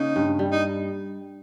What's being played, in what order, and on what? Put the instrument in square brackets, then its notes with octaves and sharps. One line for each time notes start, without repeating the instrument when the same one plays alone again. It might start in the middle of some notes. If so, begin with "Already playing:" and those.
Already playing: [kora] C#3 A#3 [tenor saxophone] D#4
[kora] G2
G3
[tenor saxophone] D#4